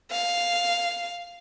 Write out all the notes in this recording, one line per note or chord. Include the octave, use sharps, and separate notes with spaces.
F5